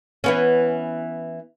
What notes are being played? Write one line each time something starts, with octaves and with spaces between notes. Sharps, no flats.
E3 B3 C#4